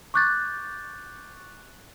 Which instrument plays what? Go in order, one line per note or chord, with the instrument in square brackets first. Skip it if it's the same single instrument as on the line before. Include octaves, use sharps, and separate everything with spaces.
[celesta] C#6 D6 F#6 G6 A6